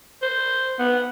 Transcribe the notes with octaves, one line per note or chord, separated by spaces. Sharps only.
C5
B3